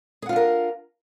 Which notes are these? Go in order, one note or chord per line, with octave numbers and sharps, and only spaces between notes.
D4 F4 G#4 A#4 F#5